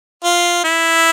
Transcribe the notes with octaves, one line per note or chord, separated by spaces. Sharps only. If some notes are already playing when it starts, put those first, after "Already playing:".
F4
E4